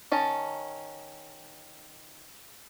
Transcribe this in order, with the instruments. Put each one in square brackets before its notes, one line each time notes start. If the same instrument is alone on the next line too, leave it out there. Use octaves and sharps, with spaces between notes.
[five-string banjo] D#3 C#4 A5 A#5